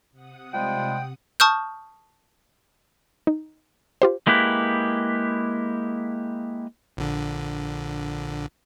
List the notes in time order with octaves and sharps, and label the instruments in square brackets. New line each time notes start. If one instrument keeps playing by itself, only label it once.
[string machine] C3 F#5 D#6
[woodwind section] F3 G3 G#3 [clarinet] G5
[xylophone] A5 C#6 D#6 F6 G6
[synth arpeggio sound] D#4
F4 G4 C5
[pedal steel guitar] G#3 A#3 E4 G4 B4
[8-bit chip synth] A#1 D3